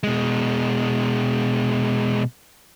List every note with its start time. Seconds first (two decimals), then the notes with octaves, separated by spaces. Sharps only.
0.03 B2 G#3